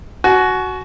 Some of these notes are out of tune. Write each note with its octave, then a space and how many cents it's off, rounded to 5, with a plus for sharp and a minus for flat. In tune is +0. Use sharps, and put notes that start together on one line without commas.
F#4 +5 G#5 +45